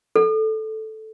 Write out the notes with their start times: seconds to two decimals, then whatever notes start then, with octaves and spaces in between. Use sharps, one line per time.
0.16 A4